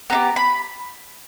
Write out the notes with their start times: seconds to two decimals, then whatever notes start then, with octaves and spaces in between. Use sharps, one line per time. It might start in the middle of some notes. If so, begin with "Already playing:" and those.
0.10 B3 D#4 G4 A#5
0.36 B5